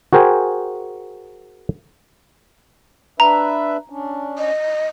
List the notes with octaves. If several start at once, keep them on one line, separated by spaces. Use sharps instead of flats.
F#4 G#4 A#4 C5 G5 G#5
D4 B4 E5 A#5
C#4 D4
D#5